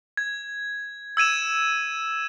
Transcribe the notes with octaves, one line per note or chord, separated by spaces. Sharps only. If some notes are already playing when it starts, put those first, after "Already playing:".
G#6
E6 G#6 D#7 E7